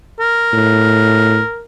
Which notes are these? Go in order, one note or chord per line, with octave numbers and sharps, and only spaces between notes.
A#4
A2